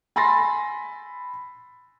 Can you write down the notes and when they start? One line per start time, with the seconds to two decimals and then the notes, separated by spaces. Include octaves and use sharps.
0.16 G#5 B5 C6 A6 A#6